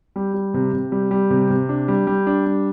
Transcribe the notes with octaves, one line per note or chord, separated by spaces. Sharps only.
G3
G3
C3
C3
G3
G3
C3
C3
D4
G3
G3
D4
G3